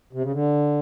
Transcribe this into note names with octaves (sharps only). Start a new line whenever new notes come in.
C3
C#3
D3